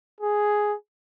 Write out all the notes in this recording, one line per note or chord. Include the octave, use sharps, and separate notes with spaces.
G#4